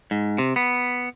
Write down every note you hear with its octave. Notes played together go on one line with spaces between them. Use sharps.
G#2
C3
B3